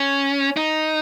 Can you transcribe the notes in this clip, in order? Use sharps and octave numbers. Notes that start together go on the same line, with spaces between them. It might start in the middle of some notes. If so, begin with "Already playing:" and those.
Already playing: C#4
D#4